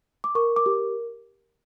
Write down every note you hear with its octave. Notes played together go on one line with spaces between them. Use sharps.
D6
A#4 C#6
D6
G4